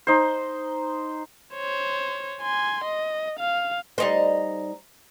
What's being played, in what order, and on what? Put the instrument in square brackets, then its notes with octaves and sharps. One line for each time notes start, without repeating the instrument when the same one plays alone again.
[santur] D#4 C5
[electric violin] C5 C#5
G#5 C6
D#5
F5
[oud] G3 D#4 C5